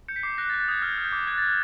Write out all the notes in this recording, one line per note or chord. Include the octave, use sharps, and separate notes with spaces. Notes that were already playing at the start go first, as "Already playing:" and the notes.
G6 C#7
B6
D6 C7
F#6 A#6
A6
F#6
A6
D#6 G#6
F6 G6
F6
G6
D6
F#6 G#6
A6
F#6 G#6